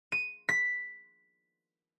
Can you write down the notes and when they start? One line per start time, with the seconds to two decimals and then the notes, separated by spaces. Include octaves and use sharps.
0.12 D#7
0.49 B6